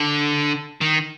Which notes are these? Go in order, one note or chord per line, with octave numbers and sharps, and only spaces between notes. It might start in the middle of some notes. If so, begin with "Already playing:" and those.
Already playing: D3
D#3